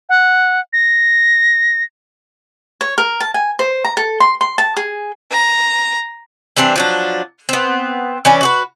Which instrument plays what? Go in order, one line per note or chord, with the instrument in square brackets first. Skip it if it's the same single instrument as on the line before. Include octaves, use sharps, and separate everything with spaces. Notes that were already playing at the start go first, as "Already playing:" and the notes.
[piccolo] F#5
A#6
[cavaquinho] C#5
A#4
A5
G#5
C5
A#5
A4
C6
C6
A5
G#4
[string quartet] A#5
[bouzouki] E3 G3 C4 D4
F3 F#3 D4
B3 C4
E3 C#4 D5
F#4 G#4 B4